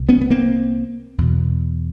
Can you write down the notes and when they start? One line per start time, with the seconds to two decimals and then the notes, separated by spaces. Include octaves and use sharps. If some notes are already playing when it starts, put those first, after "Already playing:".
Already playing: C2 A#2
0.09 B3 C#4
0.21 B3
0.30 A#3 C4
1.18 E2 B2